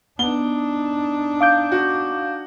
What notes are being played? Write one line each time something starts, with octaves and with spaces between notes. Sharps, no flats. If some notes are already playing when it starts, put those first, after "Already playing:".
B3 D4 D#4 G7
F5 D6 G6
F#4